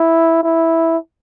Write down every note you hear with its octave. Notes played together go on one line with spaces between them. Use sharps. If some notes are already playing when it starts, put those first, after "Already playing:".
Already playing: E4
E4